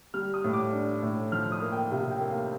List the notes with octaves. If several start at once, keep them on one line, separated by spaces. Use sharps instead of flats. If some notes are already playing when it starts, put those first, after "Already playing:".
G3 F6
D#6
A2
D6
D4
A2
F3 F6
D#6
A#3
G5
C3 F5
G5
A#3
F5